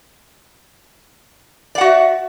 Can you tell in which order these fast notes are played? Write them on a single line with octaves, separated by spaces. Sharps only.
D5 F#5 F#4 E5